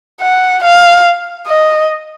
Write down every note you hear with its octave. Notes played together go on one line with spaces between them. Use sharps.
F#5
F5
D#5